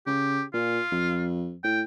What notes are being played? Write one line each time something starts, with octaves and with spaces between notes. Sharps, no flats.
C#3 G4
A#2 F4
F2
A2 G5